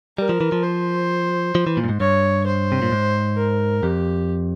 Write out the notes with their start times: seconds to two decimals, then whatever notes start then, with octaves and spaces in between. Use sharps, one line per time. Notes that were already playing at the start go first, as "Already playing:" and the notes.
0.18 G3 A#4
0.29 F3
0.41 E3
0.52 F3
0.63 C5
1.55 F3
1.67 E3
1.77 A#2
1.84 G2
1.89 G#2
2.00 G2 C#5
2.46 C5
2.72 C3
2.82 A#2
2.92 G#2
3.37 A#4
3.83 F2 G4